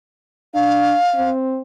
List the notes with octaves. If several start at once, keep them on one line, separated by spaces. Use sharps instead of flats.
D4 F5
C4